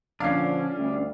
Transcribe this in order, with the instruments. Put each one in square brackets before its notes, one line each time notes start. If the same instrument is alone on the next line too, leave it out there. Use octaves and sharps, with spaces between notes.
[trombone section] A#2 D3 F3 [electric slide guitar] C#4 D4 [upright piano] F5 C7
[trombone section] D2 G3